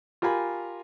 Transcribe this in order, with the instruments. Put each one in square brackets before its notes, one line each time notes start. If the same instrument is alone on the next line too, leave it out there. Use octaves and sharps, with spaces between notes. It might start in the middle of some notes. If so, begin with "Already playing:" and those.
[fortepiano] F4 G4 A#4 F5 G#5 B5